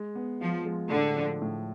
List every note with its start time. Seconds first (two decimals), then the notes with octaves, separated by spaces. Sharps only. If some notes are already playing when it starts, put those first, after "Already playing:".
Already playing: G#3
0.15 B3
0.41 F3 F4
0.65 G#3
0.91 A2 D3
1.16 F3
1.42 A2